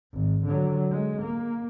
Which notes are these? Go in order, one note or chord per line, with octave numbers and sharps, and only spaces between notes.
G#1
D3 F#3
G#3
A#3